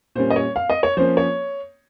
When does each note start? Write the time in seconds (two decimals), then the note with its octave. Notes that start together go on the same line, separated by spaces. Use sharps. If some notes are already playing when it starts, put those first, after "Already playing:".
0.15 A#2 G3 C#4 C5
0.30 D#5
0.36 C#5
0.56 F5
0.70 D#5
0.83 C#5
0.97 F3 A#3 C#4 C5
1.17 C#5